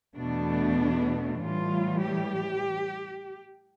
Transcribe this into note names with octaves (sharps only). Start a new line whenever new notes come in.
E2 B2 A3 D4
A2 E3 G3 F4
G4